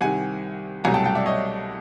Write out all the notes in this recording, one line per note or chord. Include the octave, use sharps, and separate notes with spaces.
C2 C3 D#3 F#5 G#5
C2 B2 F#3 A3 G#5 A#5
G5 A5
G5 A5
D5 E5
C#5 D#5